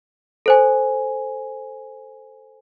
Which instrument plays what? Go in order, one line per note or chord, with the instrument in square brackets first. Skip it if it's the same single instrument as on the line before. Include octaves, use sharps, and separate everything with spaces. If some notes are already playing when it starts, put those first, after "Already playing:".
[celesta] A4 C5 G#5